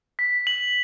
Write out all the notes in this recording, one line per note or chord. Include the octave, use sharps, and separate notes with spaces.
B6
F#7